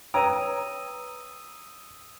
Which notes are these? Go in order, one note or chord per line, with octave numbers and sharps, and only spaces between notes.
B4 C#5 G5 A#5 D#6 E6 D#7